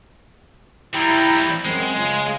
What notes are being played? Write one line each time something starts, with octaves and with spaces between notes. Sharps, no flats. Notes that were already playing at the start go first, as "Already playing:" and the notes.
F3 G3 E4 G5 A#5
F#2 G#3 C4
C#3 F3